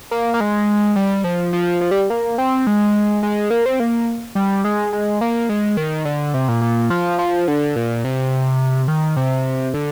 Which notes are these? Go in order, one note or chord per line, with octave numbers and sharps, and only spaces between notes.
A#3
A#3
G#3
G3
F3
F3
F3
G3
A#3
C4
G#3
G#3
A#3
C4
A#3
G3
G#3
G#3
A#3
G#3
D#3
D3
C3
A#2
A#2
F3
F3
D3
A#2
C3
D#3
C3
D3